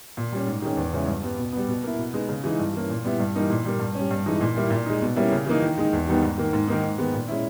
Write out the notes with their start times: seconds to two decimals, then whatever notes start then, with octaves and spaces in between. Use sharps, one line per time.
0.17 A#2
0.32 G3 C#4
0.47 G#2
0.62 D#3 G#3 C#4
0.77 E2
0.93 C#3 G#3 C#4 E4
1.07 G2
1.23 G3 B3
1.39 B2
1.53 G3 B3
1.68 B2
1.83 A#3 E4
1.98 B2
2.13 G#3 B3 D#4
2.29 C#3
2.44 E3 G#3 D#4
2.59 G2
2.74 E3 A#3 C#4
2.90 A#2
3.05 G3 B3 E4
3.20 G2
3.35 E3 G3 A#3 D#4
3.50 A#2
3.65 G3 A#3
3.80 G2
3.95 C#4
4.00 G3
4.11 G2
4.26 E3 G#3 D#4
4.41 A#2
4.56 G3 A#3 E4
4.70 A#2
4.86 G#3 D#4
5.02 B2
5.16 G3 A#3 C#4 E4
5.32 C#3
5.46 E3 A#3 D#4
5.62 D#3
5.78 G#3 D#4
5.93 E2
6.07 D#3 G3 B3 D#4
6.22 G#2
6.38 D#3 A#3
6.53 G#2
6.68 D#3 A#3 D#4
6.82 G#2
6.98 D#3 G#3 B3
7.14 A#2
7.28 G#3 C#4 E4